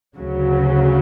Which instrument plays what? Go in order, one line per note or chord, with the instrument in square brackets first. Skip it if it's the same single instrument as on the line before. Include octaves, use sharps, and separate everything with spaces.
[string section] D2 C#3 F#3